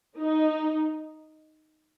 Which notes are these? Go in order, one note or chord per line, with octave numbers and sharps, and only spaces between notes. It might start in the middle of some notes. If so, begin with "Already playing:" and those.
D#4